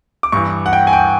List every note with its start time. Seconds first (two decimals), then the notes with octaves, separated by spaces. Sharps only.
0.23 D6
0.32 G2 E3 C#6
0.66 F#5
0.73 G5
0.87 G#5
0.93 G5